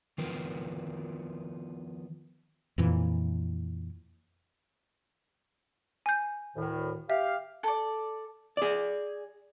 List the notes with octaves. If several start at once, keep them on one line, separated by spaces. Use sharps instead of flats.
D#3 F3 B3 A#4
F2 A#2 E3
G#5 G6
D2 A2 D#3
G4 E5 F5
A4 D5
G#4 D5